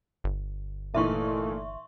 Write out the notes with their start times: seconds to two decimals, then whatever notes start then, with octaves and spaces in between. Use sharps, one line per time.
0.24 G1
0.95 A#2 E3 A3 D#4 E5 C6 C#6